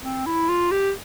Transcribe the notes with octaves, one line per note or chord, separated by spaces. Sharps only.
C4
E4
F4
G4